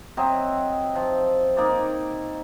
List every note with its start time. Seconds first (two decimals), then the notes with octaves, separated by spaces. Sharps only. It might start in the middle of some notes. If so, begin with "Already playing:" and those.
0.17 F#3 C4 D#5 E5
0.95 F3
1.57 A#3 D#4 D5